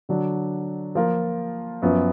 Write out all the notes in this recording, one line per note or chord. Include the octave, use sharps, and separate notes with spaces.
D3 F#3 D4
F3 A#3 F4 A#4
F#2 F3 B3